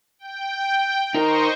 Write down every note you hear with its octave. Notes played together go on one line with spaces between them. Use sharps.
G5
D#4 A#4 C5 D#5 C#6